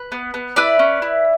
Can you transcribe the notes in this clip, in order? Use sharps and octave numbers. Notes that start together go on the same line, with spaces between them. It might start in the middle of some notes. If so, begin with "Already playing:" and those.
Already playing: B4
B3
B3
E4 B4 D5
C#4
E4